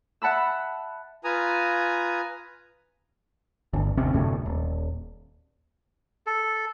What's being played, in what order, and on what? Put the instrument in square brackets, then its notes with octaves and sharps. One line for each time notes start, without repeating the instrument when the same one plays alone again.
[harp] E5 F#5 A5 B5 E6
[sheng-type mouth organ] F4 B4 G#5 A#5 D#6
[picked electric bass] G1 D2
G#1 D#2 C3 C#4
F#1 D2 A2 C3
D#1
[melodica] A4